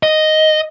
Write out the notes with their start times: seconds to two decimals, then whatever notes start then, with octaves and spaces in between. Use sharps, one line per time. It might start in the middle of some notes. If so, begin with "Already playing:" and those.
0.03 D#5